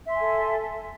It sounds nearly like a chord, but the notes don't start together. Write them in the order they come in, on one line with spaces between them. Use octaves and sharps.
E5 C6 G#5 A4